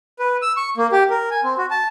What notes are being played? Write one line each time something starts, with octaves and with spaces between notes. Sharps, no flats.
B4
E6
C#6
A#3
G4
A#4
G#5
C4
F#4
A5